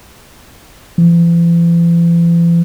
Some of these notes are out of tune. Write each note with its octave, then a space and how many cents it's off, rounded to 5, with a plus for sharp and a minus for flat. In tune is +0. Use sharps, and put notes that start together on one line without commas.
E3 +45